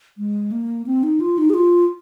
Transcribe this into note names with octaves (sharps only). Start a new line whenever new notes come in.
G#3
A#3
C4
D#4
F4
D#4
G#4
F4